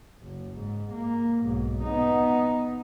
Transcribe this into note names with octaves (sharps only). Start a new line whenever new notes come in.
F#1
G#2
A#3
B1 G#2
B3 D#4